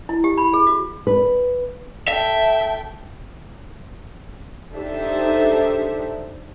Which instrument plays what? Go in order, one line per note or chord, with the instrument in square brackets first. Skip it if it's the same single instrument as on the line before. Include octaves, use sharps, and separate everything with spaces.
[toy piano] E4
G4
B5
G#4
F#4
[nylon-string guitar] B4
[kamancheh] A4 G5 [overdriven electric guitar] E5
[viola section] D4 D#4 G4 A4 C5 E5